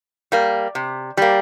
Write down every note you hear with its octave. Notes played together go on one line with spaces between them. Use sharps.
G3 A#3
C3
G3 A#3